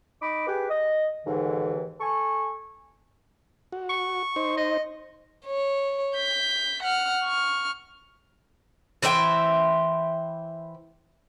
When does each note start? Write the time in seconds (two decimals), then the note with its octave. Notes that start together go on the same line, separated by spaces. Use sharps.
0.21 D#4 B5 D6
0.46 G4 G#4 B4
0.69 D#5
1.25 D#2 G#2 D3 E3
2.00 A4 G#5 C#6
3.72 F#4
3.89 C#6
4.36 D#4 C5
4.57 D#5
5.46 C#5
6.16 G6 B6
6.83 F#5 F6
7.23 C#6 F6
9.02 E3 C5 E5 G5